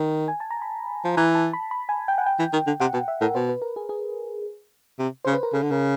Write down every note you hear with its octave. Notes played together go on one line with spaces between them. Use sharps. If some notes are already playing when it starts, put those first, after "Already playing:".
Already playing: D#3
G#5
A5
A#5
B5
F3
E3 A#5
A5
B5
B5
G#5
G5
F#5
G5
E3
D#3
D3
C3 F#5
B2 F#5
E5
A2 A#4
B2 C5
B4
A#4
G#4
G#4
C3
C#3 C5
B4
A#4
C#3 A4
D3
C#3 A#4